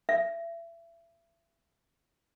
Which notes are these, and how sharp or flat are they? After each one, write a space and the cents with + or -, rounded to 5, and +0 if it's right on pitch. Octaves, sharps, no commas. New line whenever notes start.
E5 +30